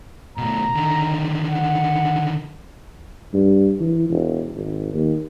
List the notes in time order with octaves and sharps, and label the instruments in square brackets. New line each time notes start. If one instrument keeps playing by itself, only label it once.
[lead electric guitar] B2 A3 [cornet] A#5
[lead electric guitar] D3 D#3
[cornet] F#5
[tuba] G2
E3
E1
G#1
D#2